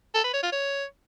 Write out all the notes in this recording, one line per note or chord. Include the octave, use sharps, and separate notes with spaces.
A4
B4
C#5
F4
C#5